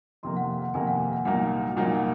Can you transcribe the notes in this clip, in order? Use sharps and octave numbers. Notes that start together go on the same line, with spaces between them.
F2 C3 D#3 A#3 C6
F#5
F#5
F2 C3 D#3 A#3 G#5
F#5
F#5
C2 A#2 F#3 A#3 D#4 F#5
F#5
C2 A#2 F#3 A#3 D#4 F#5
F#5